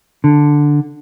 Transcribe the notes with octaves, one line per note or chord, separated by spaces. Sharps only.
D3